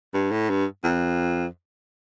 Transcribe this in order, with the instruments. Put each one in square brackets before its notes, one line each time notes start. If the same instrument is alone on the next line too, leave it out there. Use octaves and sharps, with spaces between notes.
[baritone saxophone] G2
A2
G2
F2